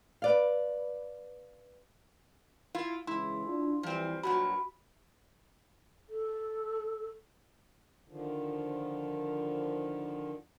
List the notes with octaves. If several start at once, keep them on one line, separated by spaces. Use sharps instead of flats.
B4 D5 F5
E4 F4 F5
C#3 E3 G#3 E4 C6
D4 F4
E3 F3 G3 C4
G2 A#2 F#3 F#4 B5
A4
D3 D#3 F3